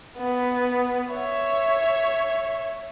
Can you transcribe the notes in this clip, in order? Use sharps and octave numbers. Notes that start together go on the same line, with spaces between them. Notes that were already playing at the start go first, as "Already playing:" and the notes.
B3
C#5 E5